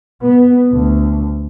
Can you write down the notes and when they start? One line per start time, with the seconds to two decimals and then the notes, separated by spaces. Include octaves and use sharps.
0.22 B3
0.72 D2